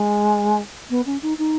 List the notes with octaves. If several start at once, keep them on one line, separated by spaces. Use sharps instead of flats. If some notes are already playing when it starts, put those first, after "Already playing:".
Already playing: G#3
B3
C#4
D#4
D#4